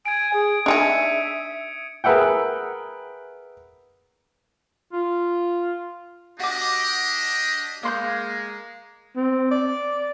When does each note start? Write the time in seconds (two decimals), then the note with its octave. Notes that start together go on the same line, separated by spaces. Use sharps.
0.06 G#5 G#6 D7
0.33 G#4
0.66 D4 D#4 G#4 E5 D#6 C#7 D#7
2.04 G#4 A#4 B4 E5 F#5 G5
4.93 F4
6.40 D4 F#4 G4 D#5 D6
7.83 G#3 A#3 C6 G6
9.16 C4
9.51 D5